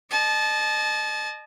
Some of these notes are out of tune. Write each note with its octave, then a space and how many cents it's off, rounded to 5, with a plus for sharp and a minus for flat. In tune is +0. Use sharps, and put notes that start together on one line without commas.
D#5 -35 A5 -30